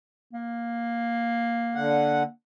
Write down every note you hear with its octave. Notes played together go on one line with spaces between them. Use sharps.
A#3
D3 F#5